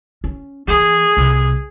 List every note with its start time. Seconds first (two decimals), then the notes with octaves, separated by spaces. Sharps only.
0.24 C#4
0.68 E3 B3 G#4
1.17 C2 C3